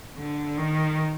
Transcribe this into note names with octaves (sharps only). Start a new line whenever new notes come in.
D3
D#3